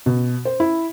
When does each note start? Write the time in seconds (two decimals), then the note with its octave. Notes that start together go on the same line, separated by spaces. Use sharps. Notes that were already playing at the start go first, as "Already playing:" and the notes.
0.06 B2
0.45 C5
0.60 E4